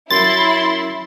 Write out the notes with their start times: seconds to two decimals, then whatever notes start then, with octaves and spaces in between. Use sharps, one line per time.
0.11 F#2 E4 C6 A6